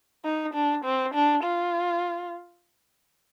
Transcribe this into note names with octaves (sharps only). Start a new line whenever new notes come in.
D#4
D4
C4
D4
F4